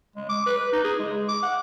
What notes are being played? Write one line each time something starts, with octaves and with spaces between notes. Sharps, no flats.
G#3
D6
B4
D#4
G#4
G#3
D6
F#5